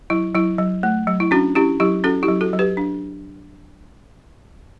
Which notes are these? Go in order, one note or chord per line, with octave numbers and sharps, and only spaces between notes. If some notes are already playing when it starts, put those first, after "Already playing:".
F#3 E4
F#3 E4
F#3
A3
F#3
E4
C#4 D4 F#4
C#4 E4 G4
F#3 E4 G4
C#4 F#4 A4
E4 G4
F#3
F#4 A4
F#3
G4 B4
D4